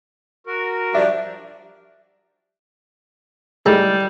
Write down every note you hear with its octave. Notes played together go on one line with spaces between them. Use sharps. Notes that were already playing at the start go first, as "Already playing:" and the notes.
F#4 A#4
F3 G3 D4 E5
A2 G3 G#3 D#4